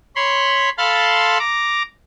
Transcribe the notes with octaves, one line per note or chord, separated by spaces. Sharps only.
C#5 B5 C6
A4 F5 B5 C6 A6
A#5 D6